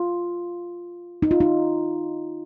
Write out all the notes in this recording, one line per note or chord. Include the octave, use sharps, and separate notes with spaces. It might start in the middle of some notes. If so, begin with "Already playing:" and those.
Already playing: F4
D#4
F4
D#4